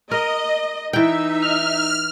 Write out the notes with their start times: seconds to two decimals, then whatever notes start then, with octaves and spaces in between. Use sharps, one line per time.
0.11 A#4 D#5
0.93 E3 D#4 E5 G5
1.42 F6